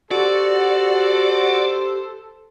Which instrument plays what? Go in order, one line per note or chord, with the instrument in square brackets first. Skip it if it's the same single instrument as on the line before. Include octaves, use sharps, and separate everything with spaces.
[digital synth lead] F#4 [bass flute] G4 [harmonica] A4 C5 [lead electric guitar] D5